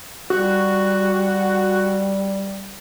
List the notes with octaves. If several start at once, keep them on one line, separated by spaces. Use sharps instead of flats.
G3 F#4